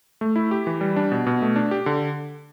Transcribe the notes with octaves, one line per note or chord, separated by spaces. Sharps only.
A3
E4
G4
E3
G3
D4
B2
B2
A3
D4
G4
D3